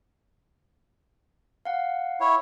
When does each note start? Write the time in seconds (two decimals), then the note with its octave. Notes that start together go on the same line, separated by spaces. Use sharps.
1.65 F5 F#5
2.20 E4 C#5